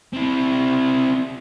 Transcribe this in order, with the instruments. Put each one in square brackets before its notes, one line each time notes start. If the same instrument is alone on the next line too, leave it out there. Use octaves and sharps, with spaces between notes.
[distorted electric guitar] C4 E4